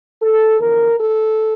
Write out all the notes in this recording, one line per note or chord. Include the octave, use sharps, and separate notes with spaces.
A4
E2 D3 F3 A#4
A4